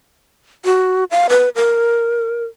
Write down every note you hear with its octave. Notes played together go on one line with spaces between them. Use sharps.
F#4
F5
B4
A#4